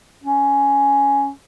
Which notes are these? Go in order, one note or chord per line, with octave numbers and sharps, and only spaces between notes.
C#4